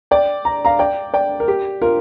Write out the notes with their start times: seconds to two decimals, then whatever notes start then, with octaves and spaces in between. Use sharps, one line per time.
0.11 D5 G5
0.45 A#5
0.65 F5 A#5
0.79 D5 G5
1.14 D5 G5
1.40 A#4
1.48 G4
1.82 F4 A#4